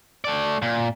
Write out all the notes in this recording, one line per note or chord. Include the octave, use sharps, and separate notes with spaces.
A3 D5
A#2